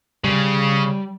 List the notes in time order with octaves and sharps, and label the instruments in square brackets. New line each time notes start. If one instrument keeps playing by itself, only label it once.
[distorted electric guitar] C#3 [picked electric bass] G3